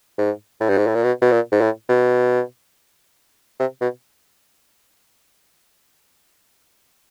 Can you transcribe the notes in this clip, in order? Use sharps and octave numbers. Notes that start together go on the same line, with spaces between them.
G#2
A2
G2
G#2
A2
A#2
B2
B2
A#2
G#2
A2
B2
C3
B2